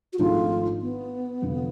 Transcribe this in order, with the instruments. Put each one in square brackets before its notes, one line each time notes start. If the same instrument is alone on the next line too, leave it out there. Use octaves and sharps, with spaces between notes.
[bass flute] F#4
[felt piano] G#1 G#2 F3 A3 D4 [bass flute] F4
[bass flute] B3
[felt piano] F1 F2 D3 F3